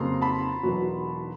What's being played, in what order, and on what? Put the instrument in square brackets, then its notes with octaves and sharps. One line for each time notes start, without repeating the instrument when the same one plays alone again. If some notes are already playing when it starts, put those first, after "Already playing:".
Already playing: [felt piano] F2 C#3 F#3 A#3 [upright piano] A#5 C6
[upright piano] A5 B5
[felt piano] E1 E2 B2 F#3